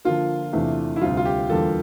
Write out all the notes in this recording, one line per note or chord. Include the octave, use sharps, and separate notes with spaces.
D3 F3 A#3 F4
E2 C3 E3 A3 D4
E4
D2 C3 G3 F4
F4
G4
E2 D3 G3 A#3 F4 A4